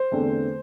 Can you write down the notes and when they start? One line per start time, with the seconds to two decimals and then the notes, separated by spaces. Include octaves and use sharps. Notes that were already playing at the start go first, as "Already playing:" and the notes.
Already playing: C5
0.11 E2 D3 A3 C4